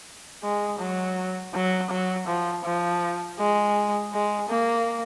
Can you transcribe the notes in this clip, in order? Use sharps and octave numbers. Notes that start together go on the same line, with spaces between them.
G#3
F#3
F#3
F#3
F3
F3
G#3
G#3
A#3